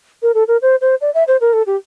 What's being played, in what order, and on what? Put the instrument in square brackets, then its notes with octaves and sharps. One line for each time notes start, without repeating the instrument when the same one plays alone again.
[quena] A#4
A4
A#4
C5
C5
D5
E5
C5
A#4
A4
G4